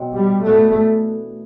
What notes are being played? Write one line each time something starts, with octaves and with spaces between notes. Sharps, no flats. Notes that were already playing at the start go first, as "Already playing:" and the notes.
Already playing: B2 F#3 C4
G3
E3 A3 B3 D4 F#4